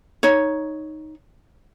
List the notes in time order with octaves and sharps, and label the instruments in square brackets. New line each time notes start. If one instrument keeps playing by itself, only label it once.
[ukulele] D#4 C#5